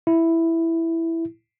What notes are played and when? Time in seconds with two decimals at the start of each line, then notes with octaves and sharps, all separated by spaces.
0.07 E4